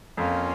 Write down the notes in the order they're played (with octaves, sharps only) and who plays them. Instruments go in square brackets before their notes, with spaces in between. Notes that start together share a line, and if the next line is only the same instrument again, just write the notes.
[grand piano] F2 [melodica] A#3 C#4 F4